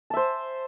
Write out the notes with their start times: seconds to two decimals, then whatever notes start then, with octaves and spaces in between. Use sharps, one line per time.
0.10 A5
0.13 E5
0.17 C5